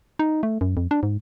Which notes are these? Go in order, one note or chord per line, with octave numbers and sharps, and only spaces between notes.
D#4
A3
F#2
F2
D4
G#2